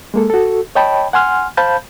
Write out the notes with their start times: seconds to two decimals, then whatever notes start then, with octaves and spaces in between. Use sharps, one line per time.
0.14 G#3 A#3 A4
0.30 F#4 A4
0.75 C#5 D#5 G5 A5 B5
1.13 F#5 G#5 C6 F6
1.57 C5 F5 A5 B5 G6